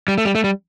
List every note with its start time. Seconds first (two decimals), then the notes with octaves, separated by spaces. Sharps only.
0.08 G3
0.18 A3
0.25 G3
0.35 A3
0.44 G3